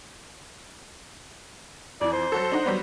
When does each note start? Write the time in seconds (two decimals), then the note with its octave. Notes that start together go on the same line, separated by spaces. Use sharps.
2.01 F2 E3 D5
2.13 C5
2.32 F#3 F#4 A4
2.52 D4 D#4 F#5
2.66 F#3 G3 B3